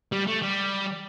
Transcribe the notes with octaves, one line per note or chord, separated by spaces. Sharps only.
G3
A3
G3